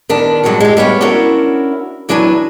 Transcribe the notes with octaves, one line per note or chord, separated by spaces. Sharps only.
D#3 B3 D4
G2 F#3 G#3 C4 F#4
G#3 G4
G3 B3 E4 C#5 F5
C#4 D4 E4 F#4 A#4
E2 F#3 D4 B4 G#5